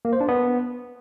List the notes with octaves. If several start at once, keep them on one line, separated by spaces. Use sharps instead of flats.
A#3
C5
D4
B3